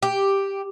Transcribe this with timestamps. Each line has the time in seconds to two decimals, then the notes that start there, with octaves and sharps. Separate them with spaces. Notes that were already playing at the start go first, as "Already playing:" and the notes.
0.02 G4